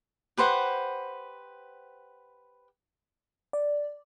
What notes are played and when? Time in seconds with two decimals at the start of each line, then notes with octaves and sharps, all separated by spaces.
0.37 G4 B4 C5 F#5
3.53 D5